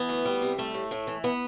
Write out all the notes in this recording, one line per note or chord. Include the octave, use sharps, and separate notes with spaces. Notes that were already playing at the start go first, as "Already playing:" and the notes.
Already playing: E3 B3
D2
G3
C3
G3 A3
A2
A2
E3
B3